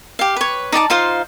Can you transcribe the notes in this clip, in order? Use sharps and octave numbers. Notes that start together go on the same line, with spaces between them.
G4 F5
B4 C#5
D#4 D5 A5 D6
D#4 F4 C5 F5